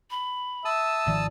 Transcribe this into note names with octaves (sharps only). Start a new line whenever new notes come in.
B5
E5 A5 D#6 E6
G#1 D#3 F3 D5